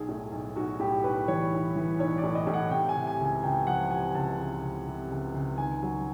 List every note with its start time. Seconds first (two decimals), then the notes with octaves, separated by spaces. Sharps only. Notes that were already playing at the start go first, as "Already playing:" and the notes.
Already playing: B1 G#4
0.09 A2
0.32 B1
0.56 B1 F#4
0.80 A2 G4
1.04 B1 B4
1.28 E3 C#5
1.52 B1
1.76 E3
1.99 B1 C#5
2.18 D5
2.23 A2
2.35 D#5
2.47 A2
2.54 F#5
2.71 C3 G5
2.89 G#5
2.96 C3
3.07 G#5
3.20 C#2
3.25 G#5
3.43 C#2 G5
3.67 F3 F#5
3.91 C3 G#5
4.15 C#2 A5
4.39 C#2
4.62 C3
4.86 C3
5.10 C#2
5.35 C#2
5.58 D#3 G#5
5.83 F#3